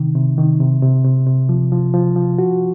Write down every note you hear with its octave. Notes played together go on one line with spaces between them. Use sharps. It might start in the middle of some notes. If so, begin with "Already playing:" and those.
Already playing: C3 D#3
C3
D#3
C3
C3
C3
C3
F3
F3
F3
F3
F#4